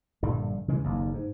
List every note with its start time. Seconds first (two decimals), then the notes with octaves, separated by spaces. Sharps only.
0.23 A#1 G2 D3 G3
0.68 C#3 E3 G#3
0.84 F#1 D#2
1.14 G#2